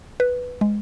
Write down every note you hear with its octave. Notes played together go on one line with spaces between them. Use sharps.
B4
G#3